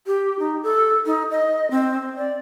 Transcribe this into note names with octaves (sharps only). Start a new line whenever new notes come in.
G4
D#4
A4
D#4
D#5
C4
D5